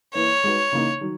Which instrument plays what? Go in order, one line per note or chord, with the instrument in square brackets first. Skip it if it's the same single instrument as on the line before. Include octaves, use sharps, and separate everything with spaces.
[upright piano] E3 A#3 E4 B4 [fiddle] C#5
[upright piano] G#3 D#4 F#4 B4
C#3 E3 A#3 D#4
D#3 F#3